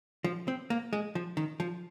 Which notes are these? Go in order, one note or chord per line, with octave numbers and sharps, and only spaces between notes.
F3
C4
A#3
G#3
F3
D#3
F3